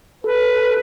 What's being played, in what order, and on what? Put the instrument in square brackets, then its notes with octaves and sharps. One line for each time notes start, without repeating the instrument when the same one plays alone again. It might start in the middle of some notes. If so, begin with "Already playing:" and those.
[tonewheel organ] A4 [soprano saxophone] B4